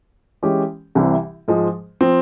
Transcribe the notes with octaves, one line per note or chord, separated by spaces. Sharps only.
E3 G#3 C#4 G4
C2 C3 E3 G3
G#2 F3 G#3
F3 C4